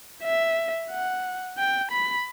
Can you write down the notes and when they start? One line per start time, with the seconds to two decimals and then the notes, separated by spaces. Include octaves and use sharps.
0.24 E5
0.91 F#5
1.58 G5
1.91 B5